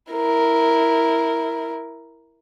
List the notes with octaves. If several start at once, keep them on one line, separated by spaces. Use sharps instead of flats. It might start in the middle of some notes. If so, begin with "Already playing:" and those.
E4 A#4